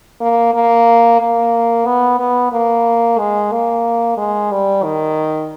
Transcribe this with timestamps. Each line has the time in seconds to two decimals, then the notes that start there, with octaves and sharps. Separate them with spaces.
0.21 A#3
0.54 A#3
1.20 A#3
1.86 B3
2.19 B3
2.52 A#3
3.18 G#3
3.52 A#3
4.17 G#3
4.51 G3
4.83 D#3